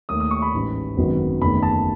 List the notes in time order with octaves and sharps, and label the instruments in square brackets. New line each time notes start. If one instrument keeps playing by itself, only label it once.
[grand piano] D#2 D#3 A3 D#6
D#6
C#6
B5
A1 G#2 E3
G#1 F#2 D#3 F#3 B3
F#1 E2 D#3 A3 B5
A5